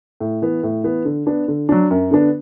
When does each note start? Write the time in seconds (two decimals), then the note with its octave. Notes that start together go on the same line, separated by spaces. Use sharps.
0.20 A2
0.42 E3 B3
0.63 A2
0.84 E3 B3
1.05 D3
1.26 B3 D4
1.48 D3
1.69 F#3 D4
1.90 F#2
2.11 D3 B3 D4